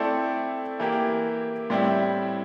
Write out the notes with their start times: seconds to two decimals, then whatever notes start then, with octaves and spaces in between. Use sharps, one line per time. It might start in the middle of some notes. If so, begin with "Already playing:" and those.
Already playing: A3 C4 E4 A4 D5
0.80 E3 A#3 E4 G4
1.70 A2 G3 C4 E4